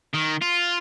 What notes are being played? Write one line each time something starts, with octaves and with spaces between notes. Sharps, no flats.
D#3
F4